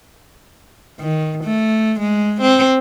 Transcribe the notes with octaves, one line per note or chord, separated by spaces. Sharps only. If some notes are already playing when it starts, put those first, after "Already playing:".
D#3
A3
G#3
C4